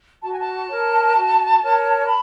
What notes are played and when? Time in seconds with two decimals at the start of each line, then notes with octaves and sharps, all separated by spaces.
0.22 F#4 A5
0.31 G#5
0.39 A5
0.69 A#4 C#5
1.16 F#4
1.62 A#4 C#5
2.07 B5